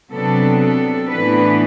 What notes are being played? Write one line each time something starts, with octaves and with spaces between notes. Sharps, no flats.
C3 F#3 B3 D4 A4
A4
A2 E3 B3 D4 B4